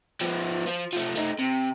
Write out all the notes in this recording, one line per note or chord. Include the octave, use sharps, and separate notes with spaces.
F3 B3
F3
F3 A3
A3 D#4
C3